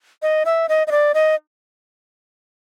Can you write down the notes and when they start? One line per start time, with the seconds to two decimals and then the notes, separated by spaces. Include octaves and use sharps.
0.23 D#5
0.45 E5
0.69 D#5
0.87 D#5
0.91 D5
1.14 D#5